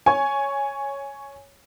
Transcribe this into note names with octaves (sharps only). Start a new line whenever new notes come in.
C#5 G#5